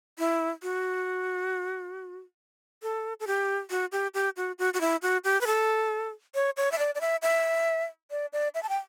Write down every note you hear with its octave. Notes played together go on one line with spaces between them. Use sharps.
E4
F#4
A4
A4
G4
F#4
G4
G4
F#4
F#4
F#4
E4
F#4
G4
B4
A4
C#5
C#5
E5
D5
D5
E5
E5
D5
D5
E5
A5
G5